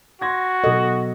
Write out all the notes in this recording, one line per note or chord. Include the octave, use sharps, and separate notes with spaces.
F#4 C6 G#6 A#6
B2 F#3 A4 D#5